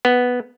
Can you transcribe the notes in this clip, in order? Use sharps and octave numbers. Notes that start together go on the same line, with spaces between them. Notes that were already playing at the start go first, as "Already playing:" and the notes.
B3